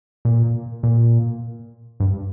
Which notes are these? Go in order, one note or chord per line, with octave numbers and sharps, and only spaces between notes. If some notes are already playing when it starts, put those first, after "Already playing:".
A#2
A#2
G2